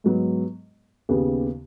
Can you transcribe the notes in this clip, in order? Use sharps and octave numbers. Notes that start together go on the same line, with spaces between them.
G#2 F#3 B3
D#2 C#3 B3 G#4